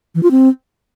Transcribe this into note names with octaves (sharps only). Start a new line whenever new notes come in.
E3
F4
C4